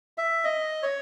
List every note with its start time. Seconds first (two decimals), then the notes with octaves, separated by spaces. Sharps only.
0.18 E5
0.44 D#5
0.83 C#5